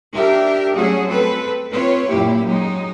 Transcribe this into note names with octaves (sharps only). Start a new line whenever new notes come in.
D4 G4 A#4 E5
F#3 G3 A3 C#4 F#4 G#4
C4 A4 B4
C4 F4 B4 C#5
F#2 A#2 A#3 E4 G4
F#3 G#3 D#4